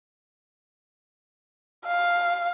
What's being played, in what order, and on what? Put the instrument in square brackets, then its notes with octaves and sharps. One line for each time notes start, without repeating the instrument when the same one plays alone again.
[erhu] F5